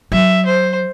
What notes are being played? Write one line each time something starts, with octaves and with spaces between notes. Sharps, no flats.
F#3 E5
C5